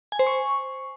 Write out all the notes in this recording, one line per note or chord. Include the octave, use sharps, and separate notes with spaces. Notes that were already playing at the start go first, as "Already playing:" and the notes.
G#5
C5
C#6